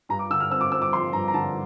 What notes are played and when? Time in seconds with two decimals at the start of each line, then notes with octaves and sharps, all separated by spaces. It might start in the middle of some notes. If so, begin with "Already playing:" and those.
0.09 G2 A#5
0.19 D6
0.30 D3 E6
0.40 F6
0.50 C4 E6
0.61 D6
0.71 C4 E6
0.82 D6
0.93 F3 C6
1.13 G2 A#5
1.28 A#5
1.34 D3 A5